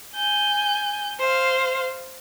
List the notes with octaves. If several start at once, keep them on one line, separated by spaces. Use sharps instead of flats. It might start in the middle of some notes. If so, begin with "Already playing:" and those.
G#5 G6
C5 F5